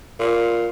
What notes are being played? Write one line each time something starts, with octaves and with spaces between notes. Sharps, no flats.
A#2